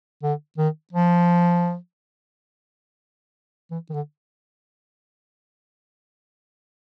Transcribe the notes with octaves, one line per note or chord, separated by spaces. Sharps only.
D3
D#3
F3
E3
D#3
D3